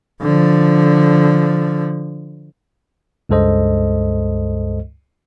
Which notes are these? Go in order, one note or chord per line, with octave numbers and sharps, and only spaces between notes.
D3 F3
C#2 G2 G#3 A4 C5 D#5